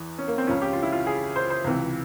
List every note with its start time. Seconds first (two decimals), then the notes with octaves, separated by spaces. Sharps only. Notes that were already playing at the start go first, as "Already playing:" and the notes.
Already playing: E2 E3
0.18 C#4
0.28 A#3
0.38 C4
0.47 C#2 C#3 F3 C#4
0.62 G4
0.73 F4
0.82 E4
0.92 F4
1.07 G#4
1.36 C5
1.50 C5
1.64 C#2 C3 E3